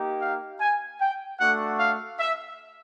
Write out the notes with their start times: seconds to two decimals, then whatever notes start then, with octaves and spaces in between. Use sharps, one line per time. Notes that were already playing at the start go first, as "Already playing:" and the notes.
Already playing: A#3 D#4 G4
0.21 F5
0.60 G#5
1.00 G5
1.40 A3 D4 F#4 F#5
1.79 F5
2.19 E5